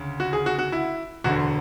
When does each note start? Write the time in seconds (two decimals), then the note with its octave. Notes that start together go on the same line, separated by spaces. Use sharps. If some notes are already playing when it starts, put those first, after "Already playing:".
Already playing: D2 C#3
0.20 F#4
0.33 G#4
0.46 F#4
0.59 F#4
0.72 E4
1.24 E1 D2 D3 F#4